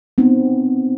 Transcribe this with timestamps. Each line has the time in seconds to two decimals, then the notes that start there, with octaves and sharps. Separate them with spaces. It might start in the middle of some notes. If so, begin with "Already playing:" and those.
0.18 B3 C4 D#4